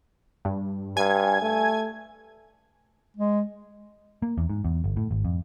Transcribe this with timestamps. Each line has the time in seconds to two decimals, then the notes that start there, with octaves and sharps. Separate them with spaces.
0.45 G2
0.97 G2 G#5 G#6
1.42 A3
3.17 G#3
4.22 A#3
4.38 E2
4.49 G#2
4.65 E2
4.84 G1
4.96 A2
5.11 G#1
5.25 F2